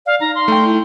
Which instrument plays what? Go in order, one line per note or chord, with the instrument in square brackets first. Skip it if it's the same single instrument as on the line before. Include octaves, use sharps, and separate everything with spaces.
[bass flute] D5 [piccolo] F5
[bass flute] D#4 [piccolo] A#5
[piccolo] C6
[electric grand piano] A3 G5
[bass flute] E4